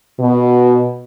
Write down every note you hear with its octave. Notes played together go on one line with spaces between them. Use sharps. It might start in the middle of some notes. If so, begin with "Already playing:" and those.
B2